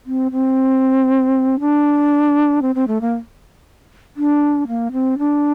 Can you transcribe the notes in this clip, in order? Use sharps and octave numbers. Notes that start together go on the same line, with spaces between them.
C4
C4
D4
C4
C4
A3
A#3
D4
A#3
C4
D4